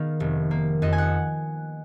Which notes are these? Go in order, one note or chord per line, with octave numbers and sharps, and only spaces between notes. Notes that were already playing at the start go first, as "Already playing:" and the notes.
Already playing: D#3 B3 F5
F1
A#3
F2 D#5
G#5
F#5